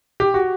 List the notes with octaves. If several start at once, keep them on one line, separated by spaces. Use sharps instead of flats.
G4
F#4